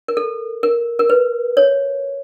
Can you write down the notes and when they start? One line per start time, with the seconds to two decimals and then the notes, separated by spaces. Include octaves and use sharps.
0.08 A#4
0.17 A4
0.63 A#4
0.99 A#4
1.10 B4
1.57 C#5